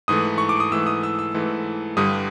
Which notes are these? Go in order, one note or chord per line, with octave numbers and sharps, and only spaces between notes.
G#2 E3 A3 D#6
C#6
D6
D#6
G#2 E3 A3 E6
D#6
E6
E6
G#2 E3 A3
G2 D3 G3 D#6